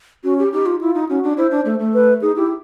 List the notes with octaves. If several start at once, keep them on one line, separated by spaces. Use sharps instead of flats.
C#4 F#4
G4
D#4 G4
F4
E4 F4
D#4
C#4 F#4
D4
E4 C5
D4
A3
A3
B4
D#4 G#4
E4 G4